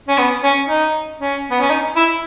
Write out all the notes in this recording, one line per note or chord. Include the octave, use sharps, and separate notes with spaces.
C#4
B3
C#4
D#4
C#4
B3
C#4
D#4
E4